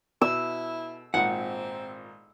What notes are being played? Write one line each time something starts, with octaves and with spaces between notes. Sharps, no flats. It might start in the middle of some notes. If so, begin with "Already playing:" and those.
B2 E4 E6
G#1 A#2 C4 F#5